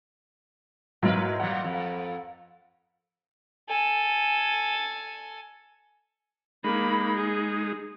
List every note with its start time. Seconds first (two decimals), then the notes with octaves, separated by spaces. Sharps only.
1.02 G#2 F#3 E4 A#4 B4
1.40 A#2 F#3 F#5
1.64 F2
3.69 A4 G#5
6.64 G#3 A#3 D#4 B5
7.17 G#4